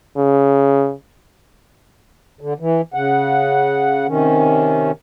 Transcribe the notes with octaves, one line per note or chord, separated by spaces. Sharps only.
C#3
D3
E3
C#3 F#5
C3 D#3 C#4